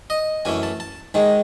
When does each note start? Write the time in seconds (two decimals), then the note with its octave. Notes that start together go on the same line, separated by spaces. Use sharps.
0.10 D#5
0.45 F#2 E3 A3 G#5
0.63 A5
0.80 A5
1.14 G#2 D#3 G#3